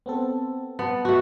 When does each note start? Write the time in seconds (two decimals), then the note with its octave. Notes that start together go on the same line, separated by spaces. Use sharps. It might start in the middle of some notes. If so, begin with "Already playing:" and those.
0.06 B3 C4 A4
0.79 B3 A5
1.05 A3 F#4